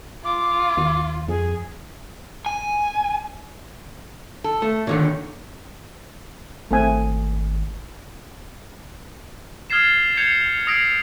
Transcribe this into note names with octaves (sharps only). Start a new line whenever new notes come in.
F4 D6
D#2
F2 G#4
G#5
A4
A3
A#2 D3 D#3 C#5
G#1 A3 C4 G#5
D#6 F6 G#6 A6 C7 E7
G6 G#6 C7 C#7 F7
D#6 E6 G#6 A#6 C7 D7